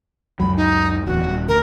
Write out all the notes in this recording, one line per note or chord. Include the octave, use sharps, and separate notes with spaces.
C#2 F#2 F#3 B5
D#4
D1 E2 F#4
D#1
D2 A#4